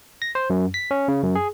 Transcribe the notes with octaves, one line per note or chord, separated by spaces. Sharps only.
A#6
C5
F#2
B6
C#4
C#3
F#2
G#4